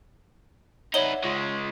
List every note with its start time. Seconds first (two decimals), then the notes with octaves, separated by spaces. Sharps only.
0.94 D#4 B4 C#5 D5 E5 F#5 G7
1.24 C#3 G#3 F4 C6 G#6